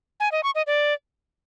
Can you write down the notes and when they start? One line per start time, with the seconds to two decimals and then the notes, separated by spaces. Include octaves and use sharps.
0.20 G#5
0.32 D#5
0.43 C#6
0.55 D#5
0.67 D5